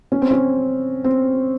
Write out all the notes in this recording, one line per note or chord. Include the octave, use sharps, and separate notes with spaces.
C#4
C4
C#4
C4